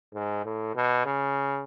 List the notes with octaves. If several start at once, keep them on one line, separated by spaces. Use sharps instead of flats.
G#2
A2
B2
C#3